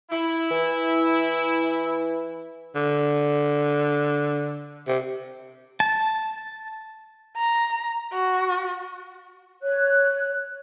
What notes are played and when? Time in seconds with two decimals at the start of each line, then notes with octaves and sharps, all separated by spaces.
0.11 E4
0.51 E3
2.75 D3
4.88 C3
5.80 A5
7.37 A#5
8.13 F#4
9.62 C#5 F#6